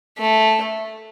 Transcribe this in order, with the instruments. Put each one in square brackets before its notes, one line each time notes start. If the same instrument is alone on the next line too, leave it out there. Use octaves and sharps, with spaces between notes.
[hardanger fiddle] A3